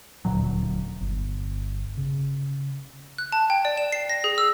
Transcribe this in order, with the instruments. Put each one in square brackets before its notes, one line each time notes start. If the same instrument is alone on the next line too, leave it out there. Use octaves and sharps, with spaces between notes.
[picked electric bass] D#1 D2 A#2 F#3
[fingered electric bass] G1
C#3
[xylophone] F#6
A5
G5
D5
E7
C7
A#6
G#4
E6